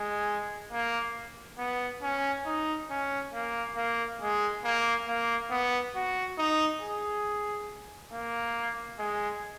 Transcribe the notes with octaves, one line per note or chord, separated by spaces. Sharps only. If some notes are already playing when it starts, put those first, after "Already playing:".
Already playing: G#3
A#3
B3
C#4
D#4
C#4
A#3
A#3
G#3
A#3
A#3
B3
F#4
D#4
G#4
A#3
G#3